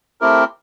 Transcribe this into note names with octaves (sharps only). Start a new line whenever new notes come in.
A3 C4 E4 G4 A#4